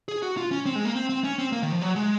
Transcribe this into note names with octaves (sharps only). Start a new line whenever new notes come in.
G#4
F#4
F4
C#4
C4
G#3
A#3
C4
C4
C#4
C4
A#3
D#3
F3
F#3
G#3